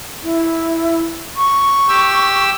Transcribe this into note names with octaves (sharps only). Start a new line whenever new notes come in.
E4
C#6
G4 E6